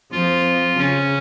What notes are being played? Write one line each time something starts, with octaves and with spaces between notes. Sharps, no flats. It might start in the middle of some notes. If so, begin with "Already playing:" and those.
F2 F3 F4
C#3 C#4